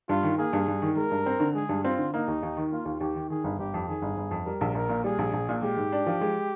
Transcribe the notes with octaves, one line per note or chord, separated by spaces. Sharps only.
G2 F4
D#3
A#3 G#4
G2
G2
D#3
G#3 A#4
G2
C4
D3
G#3 G#4
G2
C4 F4
D3
A#3 D#4
D#2
D#2
D#3
A#3 F4
D#2
D#2 G4
D#3
D#3 G#4
G1
G1 G4
F2
D#3 G#4
G1
G1
F2
G3 A#4
A#1
A#1 A#4
A#2
G3 G#4
A#1
A#1
A#2
G#3 G4
G#2
D4
F3
G#3